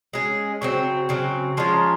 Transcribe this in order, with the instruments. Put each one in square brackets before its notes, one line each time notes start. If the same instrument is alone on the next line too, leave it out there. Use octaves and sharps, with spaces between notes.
[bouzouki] G#3 C#4 G#4
[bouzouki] C#3 F#3 C4 [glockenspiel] C#6
[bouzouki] C#3 F#3 C4
[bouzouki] F3 G#3 C#4 F4 [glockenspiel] C6
[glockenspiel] A#5